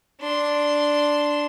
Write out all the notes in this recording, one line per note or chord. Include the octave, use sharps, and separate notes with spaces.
D4 C6